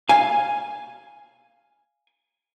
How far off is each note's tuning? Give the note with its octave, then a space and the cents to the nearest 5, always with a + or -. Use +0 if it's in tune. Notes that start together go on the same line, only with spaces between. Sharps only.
F5 +0 G#5 +0